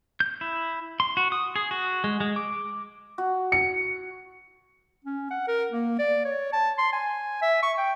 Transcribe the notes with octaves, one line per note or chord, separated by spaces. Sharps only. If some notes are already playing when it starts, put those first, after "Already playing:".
G6
E4
C6
F#4
D#6
G#4
F#4
G#3
G#3
D6
F#4
C#7
C#4
F#5
A#4
A#3
D5
C#5
A5
C6
G#5
E5
C#6
G5